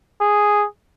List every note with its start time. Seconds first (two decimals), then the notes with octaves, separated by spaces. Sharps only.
0.21 G#4